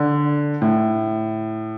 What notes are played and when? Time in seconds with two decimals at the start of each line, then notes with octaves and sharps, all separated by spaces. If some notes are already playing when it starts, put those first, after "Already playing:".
Already playing: D3
0.62 A2